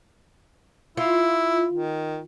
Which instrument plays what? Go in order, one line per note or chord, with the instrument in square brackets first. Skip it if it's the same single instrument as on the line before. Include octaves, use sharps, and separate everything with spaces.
[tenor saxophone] E4 [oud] F4
[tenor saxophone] D#3